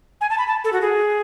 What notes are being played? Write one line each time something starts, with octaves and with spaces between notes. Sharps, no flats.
G#5
A5
B5
A5
A4
F#4
G#4